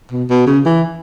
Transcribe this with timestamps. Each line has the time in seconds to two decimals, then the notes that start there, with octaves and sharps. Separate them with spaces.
0.11 B2
0.30 B2
0.47 C#3
0.65 E3